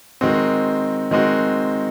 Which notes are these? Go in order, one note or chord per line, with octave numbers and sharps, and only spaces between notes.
D#3 G#3 C4 F#4
D#3 G#3 C4 F#4